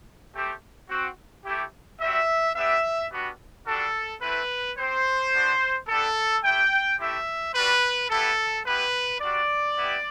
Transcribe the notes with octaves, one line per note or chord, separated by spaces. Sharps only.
A3 C4 G4
C4 F#4
A3 E4 G4
G3 C4 F#4 E5
B3 D4 G4 E5
G3 B3 D4 F#4
G3 D4 F#4 A4
A3 C4 E4 B4
C4 G4 C5
B3 D4 F#4
B3 D4 G4 A4
A3 E4 G4 G5
A3 C4 E4 G4 E5
G3 D4 F#4 B4
B3 E4 G4 A4
B3 E4 G4 B4
G3 D4 F#4 D5
B3 E4 G4